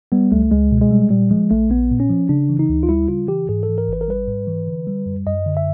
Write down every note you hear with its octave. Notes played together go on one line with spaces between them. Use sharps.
G3 B3
C#2 A3
C#2 G#3
B2
G#3
G3
A#2 G3
F3 G#3
A#1 A3
A#1 B3
A#2
C#4
F3
C#3 D4
E3
D#4
D2
F4
G3 E4
C#3 F4
E3 G4
G#2 G#4
A4
E3
A#4
G#1 B4
A#4
G3 B4
G#2
E3
D3
G3
F#2
F#2 D#5
D3
E5